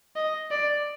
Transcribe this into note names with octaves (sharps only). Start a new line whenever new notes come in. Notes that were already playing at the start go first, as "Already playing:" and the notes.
D#5
D5